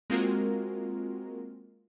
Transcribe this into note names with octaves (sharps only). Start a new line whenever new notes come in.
G#3 A#3 C4 F4 F#4 A#4